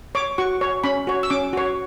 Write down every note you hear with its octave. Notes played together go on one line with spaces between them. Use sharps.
C#5 D6
F#4 C#6
C#5
C#4 B5
F#4 C#5
E6
C#4 D6
F#4 C#5